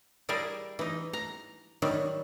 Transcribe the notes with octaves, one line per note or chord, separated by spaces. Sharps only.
G3 E4 G#4 A#4 D5
E3 D#4
A#5
D#3 F#3 G3